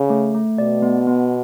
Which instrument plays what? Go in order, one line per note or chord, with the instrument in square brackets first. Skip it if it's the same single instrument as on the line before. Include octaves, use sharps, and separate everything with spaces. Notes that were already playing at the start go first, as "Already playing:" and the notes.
Already playing: [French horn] C#3
[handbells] A3
A3
[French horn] B2 [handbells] D5
[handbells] B3
B3